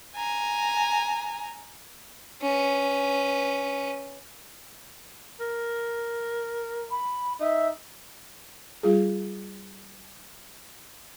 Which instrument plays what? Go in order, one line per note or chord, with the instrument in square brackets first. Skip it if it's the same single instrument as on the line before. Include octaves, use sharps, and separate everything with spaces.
[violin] G#5 A#5
[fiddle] C#4 B4
[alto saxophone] A#4
[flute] B5
[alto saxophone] D#4 [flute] E5
[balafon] G3 F4 G#4